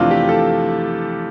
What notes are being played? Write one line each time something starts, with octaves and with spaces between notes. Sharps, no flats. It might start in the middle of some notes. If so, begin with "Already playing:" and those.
Already playing: F2 C3 E3 A3 D4 F4
G4
A4